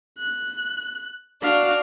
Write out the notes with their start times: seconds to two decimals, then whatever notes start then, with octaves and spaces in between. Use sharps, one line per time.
0.18 F#6
1.42 D4 F#4 F5